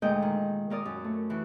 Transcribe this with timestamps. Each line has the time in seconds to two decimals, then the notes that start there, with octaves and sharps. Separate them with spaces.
0.02 D2 A#2 G#3 D#5 G5 G6
0.22 D#3
0.70 A#2 A#4 D5 D#6
0.85 F#2
1.04 A3
1.30 E3 F#4